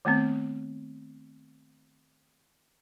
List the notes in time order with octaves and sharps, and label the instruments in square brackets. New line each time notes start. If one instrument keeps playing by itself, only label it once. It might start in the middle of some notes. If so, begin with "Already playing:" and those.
[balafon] D#3 A3 B3 C4